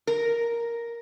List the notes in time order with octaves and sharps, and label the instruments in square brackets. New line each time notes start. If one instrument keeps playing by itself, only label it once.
[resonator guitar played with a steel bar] A#4